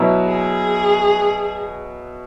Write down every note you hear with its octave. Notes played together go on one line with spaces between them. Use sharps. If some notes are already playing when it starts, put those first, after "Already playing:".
Already playing: B2 F#3 B3 E4
G#4